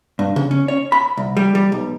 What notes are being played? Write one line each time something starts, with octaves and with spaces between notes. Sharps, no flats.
G2
C#3
C#4
C#5
B5
C2
G3
G3
B1